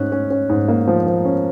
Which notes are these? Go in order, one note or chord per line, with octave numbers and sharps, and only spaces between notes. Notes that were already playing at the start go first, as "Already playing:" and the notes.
Already playing: G#2 C#4 F#6
C#4
C#4
G#2
A#3
F3
F3
C#4